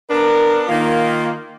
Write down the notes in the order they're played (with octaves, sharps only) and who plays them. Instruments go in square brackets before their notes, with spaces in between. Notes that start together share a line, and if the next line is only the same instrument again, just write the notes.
[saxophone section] B3 D4 [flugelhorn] A#4
[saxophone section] D#3 A#3 [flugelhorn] F4